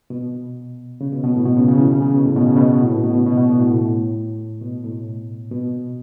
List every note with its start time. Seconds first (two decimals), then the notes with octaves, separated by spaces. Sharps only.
0.10 B2
1.01 C#3
1.12 B2
1.24 B2
1.34 A2
1.46 B2
1.57 C#3
1.69 C#3
1.79 E3
1.91 C#3
2.02 C#3
2.13 B2
2.25 A2
2.36 B2
2.46 C#3
2.56 B2
2.81 A2
2.92 B2
3.03 B2
3.15 C#3
3.26 B2
3.37 B2
3.49 D3
3.60 A2
4.61 B2
4.84 A2
5.52 B2